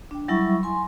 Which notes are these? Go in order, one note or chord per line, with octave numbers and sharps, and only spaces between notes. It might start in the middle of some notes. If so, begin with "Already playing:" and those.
D4 G5
F#3 G3 E4 E5 B5 C#6
G#5 C6